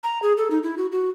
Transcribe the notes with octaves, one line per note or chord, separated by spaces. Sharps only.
A#5
G#4
A4
D#4
E4
F#4
F#4